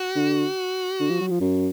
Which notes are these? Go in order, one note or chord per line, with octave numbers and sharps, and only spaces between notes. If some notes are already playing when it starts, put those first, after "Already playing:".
Already playing: F#4
D3
D3
F3
F#3
F3
F#2